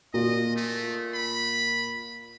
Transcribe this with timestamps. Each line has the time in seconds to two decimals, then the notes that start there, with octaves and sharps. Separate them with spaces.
0.14 A#2 D#5
0.56 A3
1.14 B5